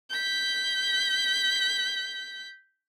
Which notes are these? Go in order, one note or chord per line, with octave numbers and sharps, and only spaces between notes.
G6 B6